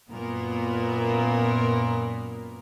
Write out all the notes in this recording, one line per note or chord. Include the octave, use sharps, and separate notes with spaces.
F#2 A#2 A#3 B3 A#4